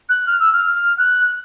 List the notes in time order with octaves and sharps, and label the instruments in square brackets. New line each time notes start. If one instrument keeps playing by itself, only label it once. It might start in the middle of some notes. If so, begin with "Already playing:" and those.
[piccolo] F#6
F6
E6
F6
F#6